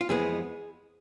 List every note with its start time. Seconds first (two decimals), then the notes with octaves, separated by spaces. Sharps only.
0.01 F4
0.09 F2 E3 G#3 B3 G#4